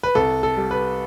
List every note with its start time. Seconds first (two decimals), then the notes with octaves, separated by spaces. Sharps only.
0.03 B4
0.15 C2 A4
0.43 A4
0.57 G3
0.71 B4